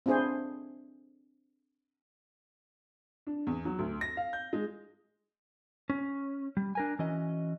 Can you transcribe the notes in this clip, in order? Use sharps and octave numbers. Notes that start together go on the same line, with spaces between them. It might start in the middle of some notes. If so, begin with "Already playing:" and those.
C4 D4 E4 G#4 C5 G#5
D4
E2
F#3
D2
A#6
F5
G6
G#3
C#4
G3
D4 A#4 G#5
E3 C#4 F#4 D#5